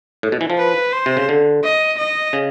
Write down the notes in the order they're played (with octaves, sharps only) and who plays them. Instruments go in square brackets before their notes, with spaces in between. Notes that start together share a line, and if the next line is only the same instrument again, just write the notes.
[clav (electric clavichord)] A2
B2
E3
F3
[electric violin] B4
C5
[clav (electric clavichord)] C3
C#3
D3
[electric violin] D#5
D#5
[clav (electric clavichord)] C#3